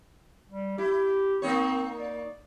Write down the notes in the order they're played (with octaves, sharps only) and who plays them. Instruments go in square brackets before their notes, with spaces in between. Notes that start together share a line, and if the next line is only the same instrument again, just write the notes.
[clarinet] G3
[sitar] E4 [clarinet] G4
[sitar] A#3 D#4 C#5 [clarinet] C4
[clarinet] D5